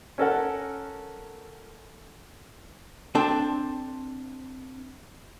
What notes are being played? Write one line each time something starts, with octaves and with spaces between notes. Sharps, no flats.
C#4 A4 A#4 F#5
C4 D4 A4 G5